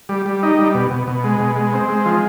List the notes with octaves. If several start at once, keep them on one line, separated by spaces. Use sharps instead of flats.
G3
G3
D#4
G3
B2
B2
B2
G#3
B2
G#3
C4
G#3
F3